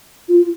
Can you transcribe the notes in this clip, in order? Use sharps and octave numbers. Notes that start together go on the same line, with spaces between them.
F4